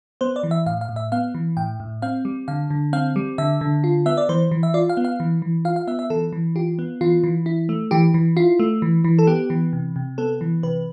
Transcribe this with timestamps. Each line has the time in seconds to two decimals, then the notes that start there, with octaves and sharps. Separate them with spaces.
0.21 B3 C5
0.36 D5
0.43 E3
0.51 E5
0.66 A2 F5
0.81 F5
0.89 A2
0.96 E5
1.12 B3 F5
1.34 E3
1.57 A2 G5
1.80 A2
2.02 C4 F5
2.25 G3
2.48 D3 F5
2.70 D3
2.93 C4 F5
3.16 G3
3.38 D3 E5
3.61 D3
3.84 F4
4.06 B3 E5
4.17 D5
4.29 E3 C5
4.51 E3
4.63 E5
4.74 F4 D5
4.89 F5
4.97 B3
5.05 F5
5.20 E3
5.42 E3
5.65 F4 F5
5.76 F5
5.87 B3 E5
5.99 E5
6.10 E3 A4
6.33 E3
6.56 F4 G4
6.79 B3
7.01 E3 F4
7.24 E3
7.46 E4
7.69 A3
7.91 E3 G4
8.14 E3
8.37 E4 F4
8.59 A3
8.82 E3
9.04 E3
9.19 A4
9.27 B3 G4
9.50 E3
9.73 C3
9.96 C3
10.18 B3 A4
10.41 E3
10.63 C3 B4